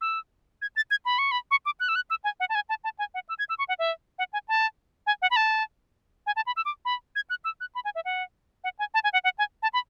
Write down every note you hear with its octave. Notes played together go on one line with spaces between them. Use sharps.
E6
G#6
A6
G#6
B5
C#6
B5
C#6
D6
F#6
E6
F#6
E6
G#5
F#5
A5
G#5
A5
A5
G#5
F#5
E6
G#6
E6
C#6
F#5
E5
F#5
G#5
A5
G#5
F#5
B5
A5
G#5
A5
B5
E6
D6
B5
G#6
F#6
E6
F#6
B5
G#5
E5
F#5
F#5
G#5
A5
G#5
F#5
F#5
G#5
A5
B5